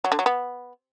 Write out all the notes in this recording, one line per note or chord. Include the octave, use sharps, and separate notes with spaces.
F#3
D3
F#3
B3